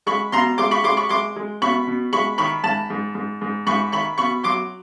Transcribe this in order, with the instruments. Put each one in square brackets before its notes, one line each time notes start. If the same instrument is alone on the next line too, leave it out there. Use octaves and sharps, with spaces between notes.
[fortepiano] G#3 B5 C#6
B2 A#5 C6
G#3 C6 D6
B5 C#6
G#3 C6 D6
B5 C#6
G#3 C6 D6
G#3
B2 B5 C#6
B2
G#3 B5 C#6
D#3 B5 C#6
G#2 A5 B5
G#2
G#2
G#2
G#2 B5 C#6
D#3 B5 C#6
B2 B5 C#6
F#3 C6 D6